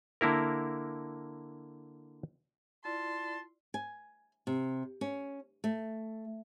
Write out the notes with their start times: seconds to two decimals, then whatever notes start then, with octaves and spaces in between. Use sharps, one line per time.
0.21 D3 A#3 E4 A#4
2.85 E4 F4 D5 A5 C6
3.74 G#5
4.47 C3
5.01 C#4
5.64 A3